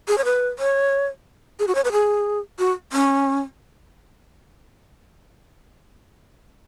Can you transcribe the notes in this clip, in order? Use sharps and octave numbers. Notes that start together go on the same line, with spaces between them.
G#4
C#5
B4
C#5
G#4
F#4
C#5
B4
G#4
F#4
C#4